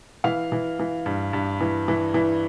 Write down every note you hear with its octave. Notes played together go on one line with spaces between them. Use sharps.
E3 F5
E3
E3
G2
G2
E3
E3
E3